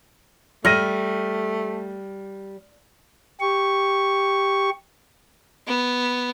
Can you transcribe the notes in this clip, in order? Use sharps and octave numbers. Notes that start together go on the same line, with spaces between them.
G3 A3 F6 A#6 D#7
G4 C#6
B3